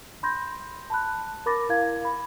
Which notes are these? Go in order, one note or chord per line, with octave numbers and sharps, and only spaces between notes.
B5 C6 G6 A#6
A5 B5 F#6
A#4 B5 D6 A6 A#6
E4 A#4 F5 G#6
B5